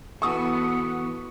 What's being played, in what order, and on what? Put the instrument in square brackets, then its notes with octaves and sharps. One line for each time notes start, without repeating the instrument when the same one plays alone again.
[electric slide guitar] E3 F#4 A4 [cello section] B3 [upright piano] C#6 D#6